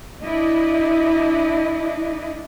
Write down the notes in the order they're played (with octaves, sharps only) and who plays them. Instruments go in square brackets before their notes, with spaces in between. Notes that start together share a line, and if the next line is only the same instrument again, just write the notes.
[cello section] D4 E4 D#5